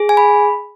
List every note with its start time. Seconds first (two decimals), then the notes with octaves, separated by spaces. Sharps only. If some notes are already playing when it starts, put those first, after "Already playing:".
Already playing: G#4
0.09 G#5
0.17 B5